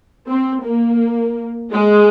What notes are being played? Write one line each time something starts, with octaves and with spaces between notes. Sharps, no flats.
C4
A#3
G#3